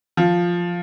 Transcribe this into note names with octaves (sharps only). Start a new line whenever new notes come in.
F3